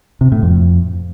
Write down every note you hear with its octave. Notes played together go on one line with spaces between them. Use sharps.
C3
A2
F2